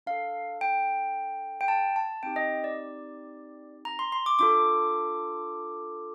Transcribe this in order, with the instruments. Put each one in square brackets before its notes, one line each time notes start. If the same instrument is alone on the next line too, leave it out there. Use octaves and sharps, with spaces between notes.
[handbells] D4 A4 F5
G5
G5
A5
A5
C4 D#4 G4 G5
D#5
D5
A#5
C6
C6
D6
D4 F4 A4 D6